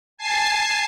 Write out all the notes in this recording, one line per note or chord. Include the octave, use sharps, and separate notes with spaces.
G#5 A5 C7